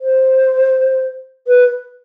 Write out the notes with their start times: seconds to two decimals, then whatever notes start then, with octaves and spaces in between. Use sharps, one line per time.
0.01 C5
1.47 B4